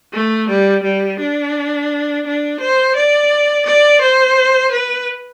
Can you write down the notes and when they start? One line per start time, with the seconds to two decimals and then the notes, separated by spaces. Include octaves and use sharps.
0.13 A3
0.48 G3
0.84 G3
1.20 D4
2.26 D4
2.60 C5
2.95 D5
3.66 D5
4.01 C5
4.71 B4